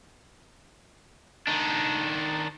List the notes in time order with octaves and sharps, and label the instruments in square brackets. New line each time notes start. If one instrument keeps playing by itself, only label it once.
[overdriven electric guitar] D#3 D4